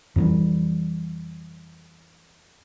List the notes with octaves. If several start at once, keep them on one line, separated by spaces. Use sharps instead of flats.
F2 E3 G3